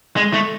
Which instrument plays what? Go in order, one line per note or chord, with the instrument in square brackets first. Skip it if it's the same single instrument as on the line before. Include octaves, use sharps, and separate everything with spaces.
[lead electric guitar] G#3
A3